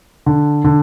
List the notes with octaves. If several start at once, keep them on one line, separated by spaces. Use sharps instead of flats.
D3
D3